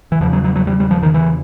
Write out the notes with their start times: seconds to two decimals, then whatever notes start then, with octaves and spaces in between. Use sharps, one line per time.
0.12 E3
0.21 E2 C#3 F3
0.33 F#3
0.44 F#3
0.56 F#3
0.67 G3
0.80 G3
0.91 F3
1.02 D#3
1.14 E3